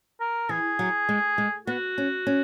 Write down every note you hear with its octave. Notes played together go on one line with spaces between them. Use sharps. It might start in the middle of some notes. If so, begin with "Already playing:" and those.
A#4
E3 G#4
F#3
G#3
G#3
B3 F#4
C#4
C#4